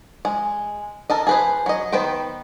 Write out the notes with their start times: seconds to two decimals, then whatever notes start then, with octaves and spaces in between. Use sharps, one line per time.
0.25 G#3
1.10 A4 A#4 D#5
1.27 G#4 B4 C5
1.66 F#3 D#5
1.92 D#3 B3 B4 C5 G5